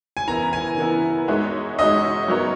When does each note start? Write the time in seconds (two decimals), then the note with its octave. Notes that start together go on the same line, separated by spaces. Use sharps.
0.17 G#5
0.28 E3 B3 E4 A#4 A#5
0.53 G#5
0.78 E3 B3 E4 A#4
1.28 G#3 D#4 F#4 C#5 E5
1.78 G#3 D#4 F#4 C#5 D#5 E5
2.28 F#3 B3 F#4 A#4 C#5